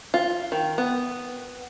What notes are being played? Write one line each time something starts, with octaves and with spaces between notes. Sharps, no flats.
F4
D#3
B3